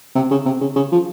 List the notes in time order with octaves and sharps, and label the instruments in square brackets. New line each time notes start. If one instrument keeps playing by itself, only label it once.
[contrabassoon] C3
C#3
C3
C#3
C#3
F3